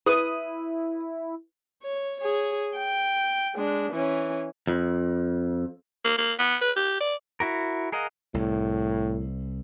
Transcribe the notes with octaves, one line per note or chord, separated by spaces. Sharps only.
E4 B4 D#6
C#5
G#4 C#5
G5
G#3 D4
E3 C#4
F2
A#3
A#3
B3
B4
G4
D5
E4 F#4 A#4
G#4 A#4 D#5 F5 F#5
C2 A2